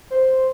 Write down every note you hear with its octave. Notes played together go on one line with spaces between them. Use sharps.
C5